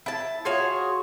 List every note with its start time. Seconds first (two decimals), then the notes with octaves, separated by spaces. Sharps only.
0.06 E4 A5
0.45 F4 F#4 G#4 C#5